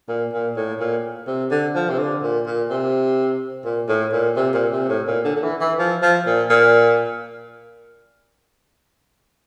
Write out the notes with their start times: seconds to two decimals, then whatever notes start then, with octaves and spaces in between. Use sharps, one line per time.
0.08 A#2
0.33 A#2
0.57 A2
0.80 A#2
1.27 C3
1.51 D3
1.75 F3
1.90 C3
1.99 D3
2.23 A#2
2.46 A#2
2.70 C3
3.65 A#2
3.88 A2
4.13 A#2
4.36 C3
4.54 A#2
4.72 C3
4.89 A2
5.07 A#2
5.25 D3
5.36 D3
5.43 E3
5.61 E3
5.78 F3
6.02 F3
6.27 A#2
6.50 A#2